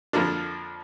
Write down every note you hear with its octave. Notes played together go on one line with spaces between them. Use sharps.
F2 D3 F3 A#3 D4